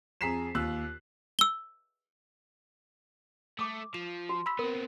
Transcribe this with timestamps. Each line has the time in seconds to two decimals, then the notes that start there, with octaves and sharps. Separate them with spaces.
0.21 F2 G#4 A#5 B6 C7 E7
0.55 D#2 F4 E6 F#6
1.39 E6 G7
3.59 A3 D6 D#6
3.94 F3 E7
4.29 F#4
4.46 B5 E6 B6
4.59 B3 C4 A#4